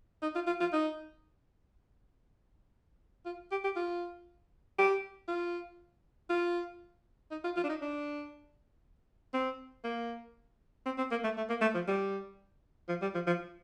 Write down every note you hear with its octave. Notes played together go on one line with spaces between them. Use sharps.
D#4
F4
F4
F4
D#4
F4
G4
G4
F4
G4
F4
F4
D#4
F4
F4
D4
D#4
D4
C4
A#3
C4
C4
A#3
A3
A3
A#3
A3
F3
G3
F3
G3
F3
F3